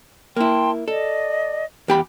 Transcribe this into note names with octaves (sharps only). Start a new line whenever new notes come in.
A#3 E4 G5 A5 C6
A4 D5 D#5
E2 G4 B5